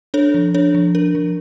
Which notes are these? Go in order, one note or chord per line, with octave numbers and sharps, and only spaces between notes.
D4 A4 C#5
F3
D4 A4 C#5
F3
D4 A#4
F3